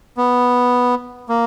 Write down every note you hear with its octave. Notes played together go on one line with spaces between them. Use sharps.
B3
A#3